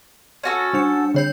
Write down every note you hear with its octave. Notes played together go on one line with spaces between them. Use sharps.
C#4 F#4 A4
G3 D4 C#7
D3 C#5 G6